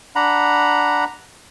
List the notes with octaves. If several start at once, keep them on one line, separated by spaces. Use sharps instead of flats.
D4 F#5 A#5 B5